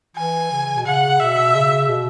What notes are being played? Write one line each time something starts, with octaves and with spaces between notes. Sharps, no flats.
E3 G#5
C#3
B2
C#3 F#5
B2 E5
C#3
B2